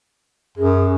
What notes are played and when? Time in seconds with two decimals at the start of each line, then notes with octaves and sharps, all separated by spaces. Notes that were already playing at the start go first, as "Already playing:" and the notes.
0.58 F#2 G#4